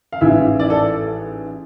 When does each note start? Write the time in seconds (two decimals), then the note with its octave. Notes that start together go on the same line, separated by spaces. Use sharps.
0.12 F5
0.21 A1 G#2 E3 E5
0.60 D5
0.70 A4